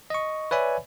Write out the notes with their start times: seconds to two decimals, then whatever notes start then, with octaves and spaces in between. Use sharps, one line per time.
0.10 D#5 C#6
0.51 B4 C#5 D5 E5 G#5 B5